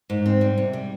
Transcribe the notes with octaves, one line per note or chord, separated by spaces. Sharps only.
G#2
C4
G3
C3
G3